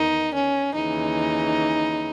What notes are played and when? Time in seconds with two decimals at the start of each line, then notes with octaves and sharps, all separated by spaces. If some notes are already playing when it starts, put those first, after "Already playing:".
Already playing: E2 D#3 D#4
0.34 C#4
0.75 D#2 C#3 E3 D#4